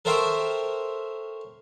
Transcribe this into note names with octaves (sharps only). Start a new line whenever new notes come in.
A4 A#4 C5 C#5 E5 G5